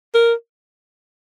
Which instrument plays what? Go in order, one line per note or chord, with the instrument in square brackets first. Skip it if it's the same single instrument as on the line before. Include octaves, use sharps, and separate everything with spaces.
[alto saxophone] A#4